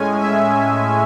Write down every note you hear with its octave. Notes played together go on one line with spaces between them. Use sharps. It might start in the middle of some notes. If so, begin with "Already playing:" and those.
Already playing: A2 G#3 C#4 G#5
E5